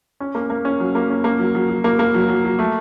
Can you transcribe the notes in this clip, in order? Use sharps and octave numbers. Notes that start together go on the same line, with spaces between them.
C#4
A#3
A#3
C#4
F#3
A#3
C#4
A#3
F#3
F#3
F#3
A#3
A#3
F#3
F#3
F#3
A3